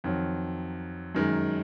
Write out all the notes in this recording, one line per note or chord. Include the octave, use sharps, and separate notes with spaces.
F2 D#3 F#3
F#2 D#3 G#3